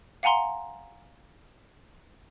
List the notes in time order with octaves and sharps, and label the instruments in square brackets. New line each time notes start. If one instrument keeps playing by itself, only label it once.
[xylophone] F5 F#5 G#5 A#5 C6